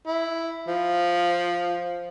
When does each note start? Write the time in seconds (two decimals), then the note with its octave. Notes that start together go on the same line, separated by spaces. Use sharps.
0.06 E4
0.67 F3